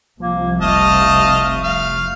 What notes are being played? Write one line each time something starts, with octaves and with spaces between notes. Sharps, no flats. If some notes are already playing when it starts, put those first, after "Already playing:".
C2 C3 F3 A#3
F1 A3 D#5 F5 A5
F5